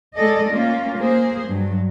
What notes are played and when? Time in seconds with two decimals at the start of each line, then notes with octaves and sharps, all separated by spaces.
0.16 G#3 G#4 A4 D5 D#5
0.51 A#3 C#4 F4
0.99 A#3 G#4 C5
1.49 G2 F#3